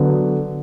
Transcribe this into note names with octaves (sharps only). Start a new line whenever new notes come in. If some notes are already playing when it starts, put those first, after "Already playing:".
Already playing: D3 F#3 B3